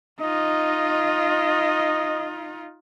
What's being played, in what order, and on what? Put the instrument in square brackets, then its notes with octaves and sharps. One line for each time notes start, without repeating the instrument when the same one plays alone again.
[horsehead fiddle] D#4 F4 [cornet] D#5